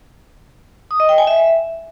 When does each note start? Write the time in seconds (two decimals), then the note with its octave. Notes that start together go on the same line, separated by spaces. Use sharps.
0.91 D#6
1.00 D#5
1.09 G5
1.18 G#5
1.27 E5